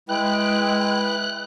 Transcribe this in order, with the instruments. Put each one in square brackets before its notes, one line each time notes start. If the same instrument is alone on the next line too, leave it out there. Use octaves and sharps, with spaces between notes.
[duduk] G#3 [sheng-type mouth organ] E4 B4 [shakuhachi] G5 [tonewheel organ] F#6